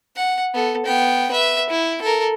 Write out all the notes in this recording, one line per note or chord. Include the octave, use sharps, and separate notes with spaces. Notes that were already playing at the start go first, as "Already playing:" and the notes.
F#5
B3 A4
B3 G5
B4 E5
E4
A4 A#4